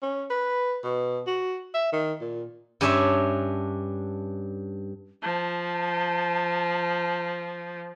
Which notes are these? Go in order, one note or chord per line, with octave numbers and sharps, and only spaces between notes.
C#4
B4
B2
F#4
E5
D#3
A#2
G2 C#4 D4 C#5 E5
F3 A5